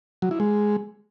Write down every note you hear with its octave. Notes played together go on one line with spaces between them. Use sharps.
F#3
E4
G#3